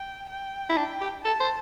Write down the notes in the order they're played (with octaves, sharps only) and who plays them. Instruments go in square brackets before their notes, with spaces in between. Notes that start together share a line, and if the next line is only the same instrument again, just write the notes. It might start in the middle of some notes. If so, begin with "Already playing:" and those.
Already playing: [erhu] G5
G5
[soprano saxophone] E4
[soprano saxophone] D4 [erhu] G5
[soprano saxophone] G4
[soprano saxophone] A4 [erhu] A5
[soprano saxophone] C5